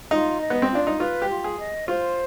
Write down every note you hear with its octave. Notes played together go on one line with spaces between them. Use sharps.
D#4 F4
D#5
B3
C4
D4 F4
D#4
F4 B4
G4
F4
G#4
D#5
F4 C5